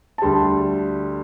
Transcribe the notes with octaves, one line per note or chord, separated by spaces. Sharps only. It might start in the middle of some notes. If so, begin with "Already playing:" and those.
A5
D2 D3 G3 C6